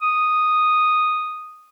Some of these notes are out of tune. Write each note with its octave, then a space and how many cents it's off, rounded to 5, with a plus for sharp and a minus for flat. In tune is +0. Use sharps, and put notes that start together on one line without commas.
D#6 -5